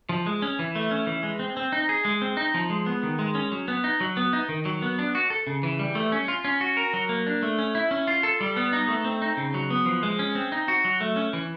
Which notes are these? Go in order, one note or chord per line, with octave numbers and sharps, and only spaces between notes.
F3
G#3
C#4
E3
A3
C#4
E3
G#3
C4
C4
D#4
G#4
G#3
C4
D#4
F3
G#3
B3
D#3
G#3
C#4
F#3
B3
D#4
F#3
B3
D#4
D#3
F#3
B3
D4
F#4
A4
C#3
E3
G3
A3
C#4
F4
C#4
F#4
A#4
F#3
A#3
D4
A3
C#4
E4
C#4
F4
A4
G3
B3
D#4
A3
C4
D#4
C#3
F#3
B3
F3
G#3
C#4
C4
D#4
F#4
F#3
A3
C#4
E3